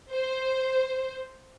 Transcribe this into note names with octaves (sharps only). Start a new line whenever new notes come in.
C5